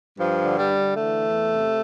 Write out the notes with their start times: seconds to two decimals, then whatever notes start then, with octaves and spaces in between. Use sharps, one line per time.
0.19 G2 F3
0.44 D3
0.57 G3
0.70 D3
0.95 E3 A3
1.21 E2
1.47 C3